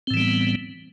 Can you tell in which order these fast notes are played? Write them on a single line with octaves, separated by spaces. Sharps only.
C4 A2 E3 G3 B3